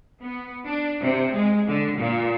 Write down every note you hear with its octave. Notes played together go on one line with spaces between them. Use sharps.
B3
D4
C3
G#3
D3
A#2